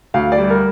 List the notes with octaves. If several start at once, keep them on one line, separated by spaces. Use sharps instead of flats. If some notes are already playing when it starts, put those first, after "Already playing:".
D2 F5
D5
G3
A#4